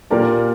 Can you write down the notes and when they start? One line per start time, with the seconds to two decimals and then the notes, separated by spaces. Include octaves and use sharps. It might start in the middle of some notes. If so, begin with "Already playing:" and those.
0.11 A#2 A#3 G4 A#4 D5